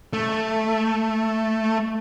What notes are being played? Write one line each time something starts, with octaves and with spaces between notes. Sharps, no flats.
A3